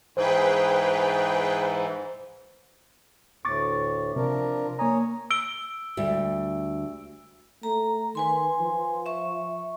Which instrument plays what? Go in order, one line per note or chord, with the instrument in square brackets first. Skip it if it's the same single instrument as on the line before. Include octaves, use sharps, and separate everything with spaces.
[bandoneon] G#2 E3 [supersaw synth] G#4 B4 G5 [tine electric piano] C5
[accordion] D2 A2 [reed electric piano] C#6 D6 A6
[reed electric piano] C3 [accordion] F3 D4 A#4
[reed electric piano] A#3 A#5 [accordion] C#5 G#5 D#6
[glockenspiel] E6 D7 G7
[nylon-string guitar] D2 G3
[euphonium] A3 [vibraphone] A#5
[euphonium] D#3 [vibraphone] B4 G#5 C6
[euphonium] F3
[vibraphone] E5 C#6